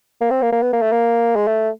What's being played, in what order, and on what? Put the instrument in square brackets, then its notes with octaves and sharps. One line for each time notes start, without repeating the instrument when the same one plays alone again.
[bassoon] A#3
C4
A#3
A#3
B3
A#3
A3
A#3
G#3
A3